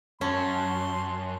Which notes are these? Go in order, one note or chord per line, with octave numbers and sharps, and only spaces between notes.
F#2 C#4 A5 C6